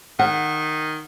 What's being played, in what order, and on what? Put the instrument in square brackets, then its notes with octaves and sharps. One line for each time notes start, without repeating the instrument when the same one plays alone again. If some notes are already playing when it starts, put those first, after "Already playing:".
[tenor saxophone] D#3 [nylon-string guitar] F#5